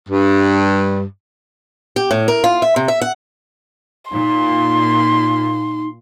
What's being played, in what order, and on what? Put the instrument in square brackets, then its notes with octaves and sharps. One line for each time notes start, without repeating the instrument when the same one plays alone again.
[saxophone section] G2
[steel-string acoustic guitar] G4
A2
A#4
F4
E5
C3
E5
F#5
[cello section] A#2 [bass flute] D#4 [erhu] C6